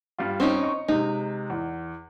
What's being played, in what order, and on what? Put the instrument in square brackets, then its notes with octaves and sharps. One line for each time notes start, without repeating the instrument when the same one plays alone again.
[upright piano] G2 G3 F4
[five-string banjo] C4 C#4 D#4
[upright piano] D#5 C#6
[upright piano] C3 G#3 [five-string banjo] D#4
[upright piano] E2